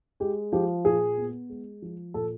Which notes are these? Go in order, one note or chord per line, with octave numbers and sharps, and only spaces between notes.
G#3 G4
F3 G4
A#2 G#4
B3
G#3
F3
A#2 A4